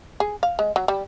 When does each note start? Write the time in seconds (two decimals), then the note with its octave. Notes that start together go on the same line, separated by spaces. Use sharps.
0.20 G#4
0.43 F5
0.59 G#3
0.76 F#3
0.88 G3